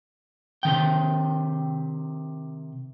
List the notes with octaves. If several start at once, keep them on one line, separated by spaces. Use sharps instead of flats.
C3 D#3 G5